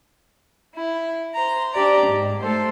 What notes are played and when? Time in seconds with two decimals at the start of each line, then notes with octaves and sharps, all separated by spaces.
0.75 E4
1.33 C5 A#5
1.72 D4 G4 D5 A#5
2.05 G#2
2.39 A3 A4 C5